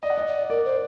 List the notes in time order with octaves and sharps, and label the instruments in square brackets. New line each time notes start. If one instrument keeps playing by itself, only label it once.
[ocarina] D5 [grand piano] D#5
[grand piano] F#5
D#5
[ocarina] D5
[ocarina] A#4 [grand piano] D5
[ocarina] C5